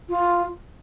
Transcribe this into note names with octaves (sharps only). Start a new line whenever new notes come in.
F4